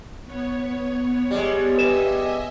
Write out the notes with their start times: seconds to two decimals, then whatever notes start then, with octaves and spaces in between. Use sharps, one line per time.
0.25 B3 C#5
1.31 G3 G#3
1.78 B4 D#5 E5 G#5 E7